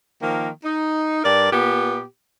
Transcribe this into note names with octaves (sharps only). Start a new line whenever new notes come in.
D#3 F3 A#3
D#4
G2 A#4 D5
A#2 B3 G4